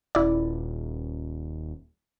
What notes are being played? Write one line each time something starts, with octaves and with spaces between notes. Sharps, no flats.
D#1 E4 D5